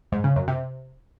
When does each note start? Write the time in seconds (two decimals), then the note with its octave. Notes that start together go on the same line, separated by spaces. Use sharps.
0.12 G#2
0.24 C#3
0.36 F#2
0.48 C3